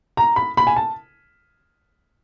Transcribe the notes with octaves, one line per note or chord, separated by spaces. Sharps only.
A#5
B5
B5
G#5
A5